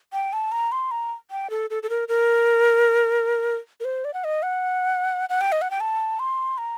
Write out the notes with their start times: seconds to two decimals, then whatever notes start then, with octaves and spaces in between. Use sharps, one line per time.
0.13 G5
0.33 A5
0.52 A#5
0.72 C6
0.91 A#5
1.31 G5
1.50 A4
1.70 A4
1.83 A4
1.90 A#4
2.08 A#4
3.80 A#4
3.85 C5
4.05 D5
4.14 F#5
4.24 D#5
4.43 F#5
5.29 F#5
5.41 G5
5.52 D#5
5.62 F#5
5.71 G5
5.80 A5
6.19 C6
6.58 A#5